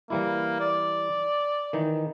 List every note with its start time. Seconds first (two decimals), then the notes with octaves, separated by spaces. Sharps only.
0.10 E3 G3 A#3 E4
0.60 D5
1.73 D#3 E3 D#4